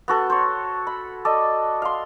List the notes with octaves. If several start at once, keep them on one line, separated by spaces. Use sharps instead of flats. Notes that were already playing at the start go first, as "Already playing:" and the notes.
B3 F#4 A4
C5 C#5
B5
A4 D5 D#5
F5 C6